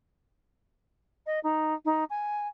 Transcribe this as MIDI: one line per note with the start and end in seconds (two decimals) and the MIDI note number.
1.26 1.40 75
1.44 1.74 63
1.85 2.04 63
2.10 2.48 80